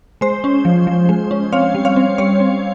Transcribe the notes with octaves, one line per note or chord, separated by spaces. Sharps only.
G#3 C5
C#4
F3
F3
G#3
C#4
C4 C#5 F5
G3
C#5 F5
C4
G3 C#5
C4